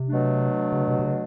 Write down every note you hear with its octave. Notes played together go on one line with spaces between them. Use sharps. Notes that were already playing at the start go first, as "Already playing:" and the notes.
Already playing: C3
B2 F#3 A3 D4
C#3
C3
C3
C#3